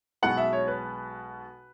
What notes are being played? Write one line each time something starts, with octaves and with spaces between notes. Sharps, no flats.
B1 B2 G#3 B3 F#5
E5
C#5
B4